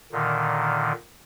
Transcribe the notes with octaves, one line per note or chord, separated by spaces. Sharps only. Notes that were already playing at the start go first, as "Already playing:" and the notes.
A#2 D3 D#3